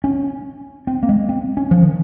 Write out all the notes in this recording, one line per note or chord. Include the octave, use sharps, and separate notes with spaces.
C#4
C4
A#3
G#3
C4
C#4
F3
D#3